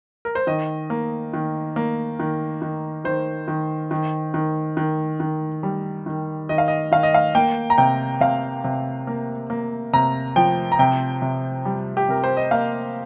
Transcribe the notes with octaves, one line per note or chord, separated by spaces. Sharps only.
A#4
C5
D#3 D#5
A#3
D#3
A#3
D#3
D#3
D#3 C5
D#3
D#3
D#3
D#3
D#3
G3
D#3
D#3 D#5
F5
D#5
D#3 F5
D#5
F5
A#3 G5
A#5
C3 G5
C3 F5
C3
A#3
A#3
C3 A#5
F3 G5
A#5
C3 G5
C3
G3
G4
C3 A#4
C5
D#5
A#3 F5